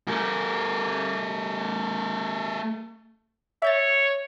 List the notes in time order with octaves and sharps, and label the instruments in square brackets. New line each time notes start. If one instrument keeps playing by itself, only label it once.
[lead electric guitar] A3 A#4
[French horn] C#5 [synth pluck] E5 G6 A6